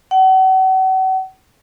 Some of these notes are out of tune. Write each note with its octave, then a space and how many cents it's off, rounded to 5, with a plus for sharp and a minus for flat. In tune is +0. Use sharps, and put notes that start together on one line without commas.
F#5 +40